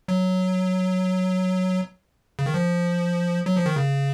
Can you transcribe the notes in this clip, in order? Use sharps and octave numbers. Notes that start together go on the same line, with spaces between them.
F#3
C#3
D#3
F3
F#3
F3
D#3
C#3